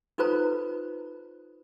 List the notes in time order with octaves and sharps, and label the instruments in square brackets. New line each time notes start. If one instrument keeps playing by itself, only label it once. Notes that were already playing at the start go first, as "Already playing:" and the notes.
[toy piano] D#4 F4 A4 B4 C5 A#5